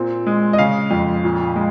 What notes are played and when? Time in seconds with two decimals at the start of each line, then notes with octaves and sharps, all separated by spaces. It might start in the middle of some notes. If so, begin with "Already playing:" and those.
Already playing: A#2 C4
0.27 G#3
0.53 D#5
0.58 C#3 F5
0.91 F2
1.24 A#2
1.56 G#3